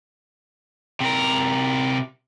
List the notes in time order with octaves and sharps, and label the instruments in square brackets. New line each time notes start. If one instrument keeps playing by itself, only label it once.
[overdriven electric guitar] C3 A#4